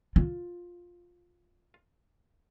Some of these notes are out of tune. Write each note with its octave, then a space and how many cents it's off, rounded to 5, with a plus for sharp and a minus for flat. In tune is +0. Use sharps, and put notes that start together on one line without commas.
F4 +10